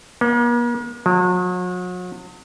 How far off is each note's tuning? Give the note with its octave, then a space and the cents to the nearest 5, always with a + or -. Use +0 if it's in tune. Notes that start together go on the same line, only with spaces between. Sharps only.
A#3 +45
F#3 -40